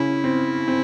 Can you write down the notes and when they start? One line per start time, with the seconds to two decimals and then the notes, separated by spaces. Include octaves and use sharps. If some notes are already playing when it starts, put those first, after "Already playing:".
Already playing: C#3 C#4 E4
0.24 C4
0.68 C4